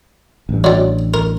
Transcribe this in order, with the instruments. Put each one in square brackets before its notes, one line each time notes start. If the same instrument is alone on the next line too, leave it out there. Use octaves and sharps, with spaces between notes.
[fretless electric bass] A1 G2
[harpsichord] F#3 G3
A#4